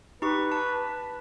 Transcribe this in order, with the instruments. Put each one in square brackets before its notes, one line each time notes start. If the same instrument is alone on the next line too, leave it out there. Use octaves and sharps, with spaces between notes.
[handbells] D#4 G4 C#6 [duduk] B4
[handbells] A5